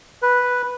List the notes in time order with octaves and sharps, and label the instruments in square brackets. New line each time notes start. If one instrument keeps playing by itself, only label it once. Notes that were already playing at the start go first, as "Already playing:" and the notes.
[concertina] B4